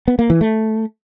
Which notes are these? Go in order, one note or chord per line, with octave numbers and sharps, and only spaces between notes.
B3
A#3
E3
A3